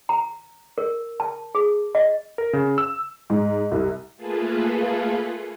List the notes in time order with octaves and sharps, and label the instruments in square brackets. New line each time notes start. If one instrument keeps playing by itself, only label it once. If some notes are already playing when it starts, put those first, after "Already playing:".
[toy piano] A#5
A#4
A5
G#4
D#5
[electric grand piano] A#4
C#3
E6
[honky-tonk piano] G#2
C2
[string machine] A3 A#3 F4 G#4 A4 B4